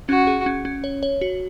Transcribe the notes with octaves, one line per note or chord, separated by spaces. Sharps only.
C#4 F#4
G#4
C#4
C#4
C#5
C#5
F#4